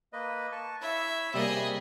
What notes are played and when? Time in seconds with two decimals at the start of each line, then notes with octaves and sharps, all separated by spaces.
0.13 A#3 B4 D#5
0.52 A5 C#6
0.82 E4 C#5 E5
1.34 C3 G3 A#3 G#4 D#5 B5